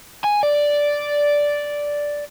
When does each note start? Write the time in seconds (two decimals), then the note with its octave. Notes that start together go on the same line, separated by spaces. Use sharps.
0.24 G#5
0.43 D5